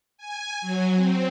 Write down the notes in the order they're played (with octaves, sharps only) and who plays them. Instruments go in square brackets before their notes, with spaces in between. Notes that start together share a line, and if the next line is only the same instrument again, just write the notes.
[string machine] G#5
F#3
C4